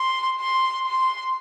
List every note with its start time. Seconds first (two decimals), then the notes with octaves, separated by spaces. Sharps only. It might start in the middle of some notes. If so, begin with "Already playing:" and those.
Already playing: C6
0.40 C6
0.87 C6